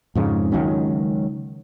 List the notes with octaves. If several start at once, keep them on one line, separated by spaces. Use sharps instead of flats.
F2 G#2 C#3
C#2 D#3 F#3 C#4